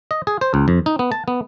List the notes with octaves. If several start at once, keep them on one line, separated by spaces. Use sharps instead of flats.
D#5
G#4
C5
C#2
F2
D#4
B3
A5
B3